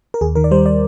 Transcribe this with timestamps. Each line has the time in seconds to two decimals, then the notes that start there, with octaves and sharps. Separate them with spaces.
0.14 A#4
0.21 D#2 G#4
0.35 D#3 A#4
0.44 D5
0.51 G3 C5
0.66 D5